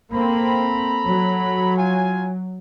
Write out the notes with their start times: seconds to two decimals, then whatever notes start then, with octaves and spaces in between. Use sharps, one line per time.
0.12 A#3 C4 A4 A#5 B5
1.06 F#3
1.77 F4 G#5